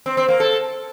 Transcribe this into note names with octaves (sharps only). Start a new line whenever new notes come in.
C4
C4
A#3
A4